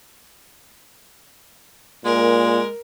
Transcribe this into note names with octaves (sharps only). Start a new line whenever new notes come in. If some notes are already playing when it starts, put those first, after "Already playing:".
A#2 G#3 A#4